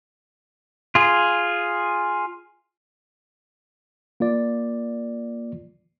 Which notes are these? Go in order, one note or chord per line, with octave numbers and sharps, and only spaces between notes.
F4 G#4
A#3 F4 D5